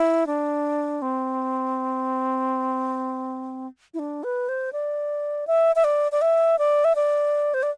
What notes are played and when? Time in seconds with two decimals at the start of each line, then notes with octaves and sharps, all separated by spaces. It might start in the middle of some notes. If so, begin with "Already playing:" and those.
Already playing: E4
0.27 D4
1.02 C4
3.94 E4
3.99 D4
4.24 B4
4.49 C5
4.73 D5
5.47 E5
5.76 E5
5.84 D5
6.12 D5
6.22 E5
6.59 D5
6.85 E5
6.95 D5
7.54 C5
7.63 D5